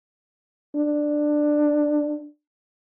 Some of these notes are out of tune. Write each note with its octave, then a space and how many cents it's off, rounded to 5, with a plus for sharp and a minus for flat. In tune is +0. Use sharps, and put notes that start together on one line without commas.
D4 +10